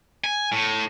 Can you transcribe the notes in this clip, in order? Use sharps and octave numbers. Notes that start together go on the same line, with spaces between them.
G#5
A2